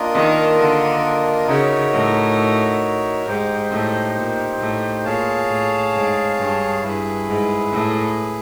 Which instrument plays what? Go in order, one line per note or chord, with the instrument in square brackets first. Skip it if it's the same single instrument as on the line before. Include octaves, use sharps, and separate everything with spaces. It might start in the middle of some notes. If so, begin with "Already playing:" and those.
Already playing: [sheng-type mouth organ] A#3 D4 F4 A#4 D#5
[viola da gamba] D#3
D3
[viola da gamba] C#3 [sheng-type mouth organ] D#4 F#4 A#4 C#5 E5
[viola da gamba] A2
[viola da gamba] G#2 [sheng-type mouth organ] D#4 G4 C5
[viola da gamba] A2
A#2
A2
[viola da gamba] A#2 [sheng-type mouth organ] G#4 C#5 F5 A5
[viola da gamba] A2
G#2
G2
[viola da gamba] G2 [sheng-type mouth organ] E4 G#4 B4
[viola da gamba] G#2
A2